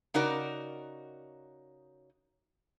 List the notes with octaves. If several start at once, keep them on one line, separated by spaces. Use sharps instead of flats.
C#3 D#4 F#4 A#4 D5